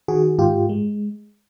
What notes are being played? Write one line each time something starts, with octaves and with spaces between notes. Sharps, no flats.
D#3 F#4 G#4
G#2 F4 G4
G#3